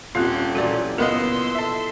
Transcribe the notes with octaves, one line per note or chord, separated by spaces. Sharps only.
D#1 C4 C#4 F4 G4
A#2 E3 F#3 A4 D5
C#2 B3 A#4 D#5 F#5 C6 E6
A4 E5